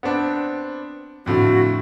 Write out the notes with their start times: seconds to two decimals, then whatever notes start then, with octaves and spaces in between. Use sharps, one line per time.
0.03 B3 C4 D4
1.26 F2 A2 D3 F#4